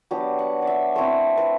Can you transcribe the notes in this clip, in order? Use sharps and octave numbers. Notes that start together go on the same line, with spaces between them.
F#3 B3 D4 G4
F#5
D5
E5
A3 C4 E4 C5
B4